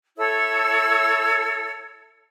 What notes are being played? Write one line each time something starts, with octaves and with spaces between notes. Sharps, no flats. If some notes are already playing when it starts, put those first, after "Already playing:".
E4 A4 C#5 E6